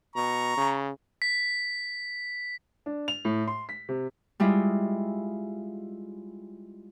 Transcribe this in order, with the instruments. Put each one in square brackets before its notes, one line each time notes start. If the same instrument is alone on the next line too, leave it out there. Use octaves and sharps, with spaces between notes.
[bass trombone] B2 [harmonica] A#5 C#6
[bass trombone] C#3
[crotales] B6
[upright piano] D4
F7
A2
C6
B6
C3
[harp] G3 G#3 E4 F4 D#5